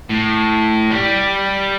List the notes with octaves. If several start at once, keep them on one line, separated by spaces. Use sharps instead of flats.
A2
G3